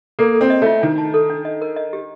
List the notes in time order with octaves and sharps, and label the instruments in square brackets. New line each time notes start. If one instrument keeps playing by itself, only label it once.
[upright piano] A#3 [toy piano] A4
[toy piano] A4
[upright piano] C4
[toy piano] D#5
[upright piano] A3 [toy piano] F4
[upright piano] D#3 [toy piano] D4
[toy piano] A5
A4
D4
D#5
A#4
D#5
G4